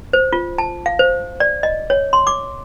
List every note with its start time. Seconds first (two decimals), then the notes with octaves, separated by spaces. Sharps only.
0.13 C5
0.33 F4
0.58 A5
0.86 F5
0.99 C5
1.40 D5
1.63 D#5
1.90 C#5
2.13 C6
2.27 D6